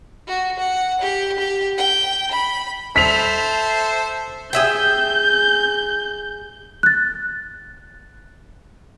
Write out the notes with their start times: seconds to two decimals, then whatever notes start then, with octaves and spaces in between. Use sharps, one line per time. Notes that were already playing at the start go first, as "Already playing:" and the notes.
0.27 F#4
0.59 F#5
1.01 G4
1.39 G4
1.78 G5
2.31 B5
2.96 A4 C5 E5 B6 F7
4.53 G#4 E5 G5 G6
6.83 F#6 A6